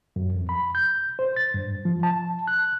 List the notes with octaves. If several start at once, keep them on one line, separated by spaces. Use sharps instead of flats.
F#2
F2
B5
G6
C5
A6
G2
F3
A5
F#6